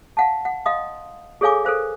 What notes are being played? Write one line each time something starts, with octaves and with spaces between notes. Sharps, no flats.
F5 F#5 A5
F#5
D#5 F5 C6 D#6
G#4 A4 C#5 F5 G#5 D6
A4 A#4 C5 F5